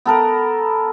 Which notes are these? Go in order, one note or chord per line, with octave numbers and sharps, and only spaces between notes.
B3 A4 A#4